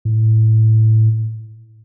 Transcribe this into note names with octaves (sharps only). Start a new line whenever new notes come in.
A2